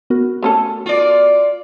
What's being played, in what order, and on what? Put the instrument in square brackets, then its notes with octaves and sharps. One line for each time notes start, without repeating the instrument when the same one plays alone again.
[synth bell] B3 F#4 A#4
[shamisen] A3 C#4 A4
[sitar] F4 D5